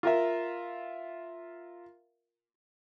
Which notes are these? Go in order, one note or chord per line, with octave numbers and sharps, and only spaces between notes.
F4 A#4 E5